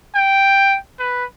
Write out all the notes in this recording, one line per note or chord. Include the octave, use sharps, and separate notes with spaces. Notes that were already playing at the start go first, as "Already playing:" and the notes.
G5
B4